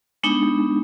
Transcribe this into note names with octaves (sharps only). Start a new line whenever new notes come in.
G#3 B3 D4 D#4